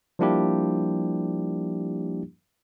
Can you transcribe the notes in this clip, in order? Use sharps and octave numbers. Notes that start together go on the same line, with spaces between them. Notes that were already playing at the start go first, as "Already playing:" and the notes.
F3 G3 A#3 D4 E4 G4